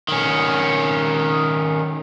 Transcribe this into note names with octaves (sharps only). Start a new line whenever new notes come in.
D#3 C#4